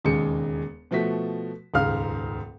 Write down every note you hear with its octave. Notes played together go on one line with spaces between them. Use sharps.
E1 D#2 C#3 G#3 C#7
B2 F3 A3 F#4 B6
D#1 C#2 G#2 F5 F6